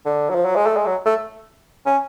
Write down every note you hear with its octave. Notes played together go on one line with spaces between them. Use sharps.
D3
F#3
F3
F#3
G#3
A3
G#3
F#3
A3
C#4